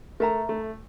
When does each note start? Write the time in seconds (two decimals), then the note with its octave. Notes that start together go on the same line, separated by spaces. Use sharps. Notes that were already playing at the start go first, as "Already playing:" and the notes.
0.20 A3 A#4 E5 A#5
0.49 A3